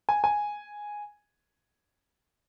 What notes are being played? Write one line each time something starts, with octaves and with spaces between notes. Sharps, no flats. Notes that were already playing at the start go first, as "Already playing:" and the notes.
G#5
G#5